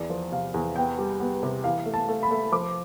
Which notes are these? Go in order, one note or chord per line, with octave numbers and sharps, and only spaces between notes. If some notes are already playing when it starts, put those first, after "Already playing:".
Already playing: E2 D5
F3
C3 F5
E2
B3 G5
G3
B3
C3
E3 F5
A3
A5
A3
B5
A3
F3 D6